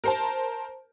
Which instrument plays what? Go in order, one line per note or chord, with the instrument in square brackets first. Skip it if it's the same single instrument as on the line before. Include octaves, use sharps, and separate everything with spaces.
[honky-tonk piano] A#4 C5 A5